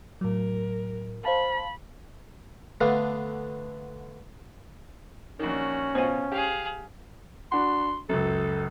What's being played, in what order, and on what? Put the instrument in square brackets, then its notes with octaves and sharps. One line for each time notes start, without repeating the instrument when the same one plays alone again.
[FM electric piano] A2 F#3 [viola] A#4
[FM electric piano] C5 F5 A5 [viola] B5
[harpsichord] D3 A3 B3 D4 F5 D#6
[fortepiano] A#1 D#3 [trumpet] C#4 [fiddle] F#4
[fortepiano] B2 F4 [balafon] C5 G#5
[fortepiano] G4 [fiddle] G#4 F5
[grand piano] D4 F#4 [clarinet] C6
[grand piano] C#2 F#2 [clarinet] A4